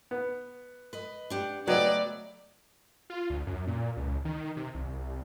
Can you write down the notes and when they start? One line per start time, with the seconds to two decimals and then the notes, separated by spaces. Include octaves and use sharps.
0.11 B3
0.93 B4 D#5
1.30 D4 G4 F#5
1.68 F#3 A3 B3 B4 D5 D#5 G5
3.10 F4
3.30 D2
3.47 F#2
3.67 A#2
3.97 C#2
4.25 D#3
4.57 C3
4.75 C2